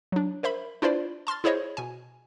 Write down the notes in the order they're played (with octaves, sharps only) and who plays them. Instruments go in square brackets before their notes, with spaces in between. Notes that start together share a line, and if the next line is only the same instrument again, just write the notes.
[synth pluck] F#3 D4
A#4 C5 E5 B5
D4 E4 F4 B4 C5 D5
A5 C6 F6 A6
E4 G#4 C5 C#5 D#5
B2 G#5